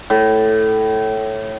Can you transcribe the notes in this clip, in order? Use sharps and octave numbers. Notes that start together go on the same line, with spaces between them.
A2